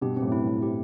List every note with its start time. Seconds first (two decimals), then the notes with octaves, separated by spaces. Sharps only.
0.01 G2 B2 G4
0.17 C4
0.22 F#2 A2
0.32 E4
0.43 G2
0.48 C4
0.62 G4